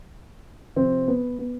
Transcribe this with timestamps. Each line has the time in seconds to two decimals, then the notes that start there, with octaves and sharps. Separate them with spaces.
0.76 C3 F3 C4
1.08 B3
1.38 B3